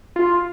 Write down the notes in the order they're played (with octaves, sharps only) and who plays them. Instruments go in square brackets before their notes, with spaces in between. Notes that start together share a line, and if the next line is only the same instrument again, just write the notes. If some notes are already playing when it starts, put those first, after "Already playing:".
[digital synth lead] F4